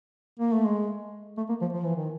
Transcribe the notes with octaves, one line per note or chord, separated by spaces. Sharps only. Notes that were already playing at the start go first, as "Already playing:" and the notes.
A#3
A3
G#3
A3
A#3
F3
F3
E3
D#3